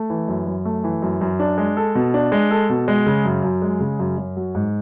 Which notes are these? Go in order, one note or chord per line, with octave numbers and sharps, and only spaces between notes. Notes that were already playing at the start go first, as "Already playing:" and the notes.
Already playing: A3
E3
F#2
F#2
A3
E3
F#2
F#2
D4
G#3
A4
B2
D4
G#3
A4
B2
G#3
C#3
F#2
F#2
G#3
C#3
F#2
F#2
F#3
G#2